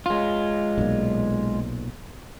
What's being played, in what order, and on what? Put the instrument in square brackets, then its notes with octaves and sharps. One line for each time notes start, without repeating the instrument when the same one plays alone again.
[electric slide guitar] G#3 F4
[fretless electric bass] B1 A#2